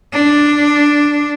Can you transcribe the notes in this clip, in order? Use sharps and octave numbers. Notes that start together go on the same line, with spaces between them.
D4